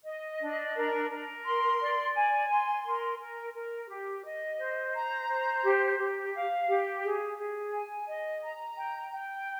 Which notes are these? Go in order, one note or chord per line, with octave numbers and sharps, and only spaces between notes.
D#5
D4
A#4
A#4
C6
D5
G#5
C6
A#4
A#4
A#4
G4
D#5
C5
A#5
C5
G4
G4
F5
G4
G#4
G#4
G#5
D#5
A#5
G5
G5